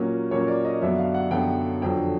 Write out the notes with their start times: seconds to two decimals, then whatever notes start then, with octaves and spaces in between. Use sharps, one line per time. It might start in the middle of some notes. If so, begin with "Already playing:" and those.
Already playing: A#2 F#3 A#3 C#4
0.31 A#2 F#3 A#3 C#4 C#5
0.48 D5
0.65 D#5
0.81 F#2 D3 F#3 B3 D4 E5
0.98 F5
1.14 F#5
1.31 F#2 D3 F#3 B3 D4 G5
1.82 F2 D3 F#3 G5